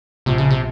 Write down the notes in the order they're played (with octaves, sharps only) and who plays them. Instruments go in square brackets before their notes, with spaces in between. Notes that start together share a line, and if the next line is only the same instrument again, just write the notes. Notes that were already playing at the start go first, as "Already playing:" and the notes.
[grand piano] A#1 [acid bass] C3
[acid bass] C#3
C3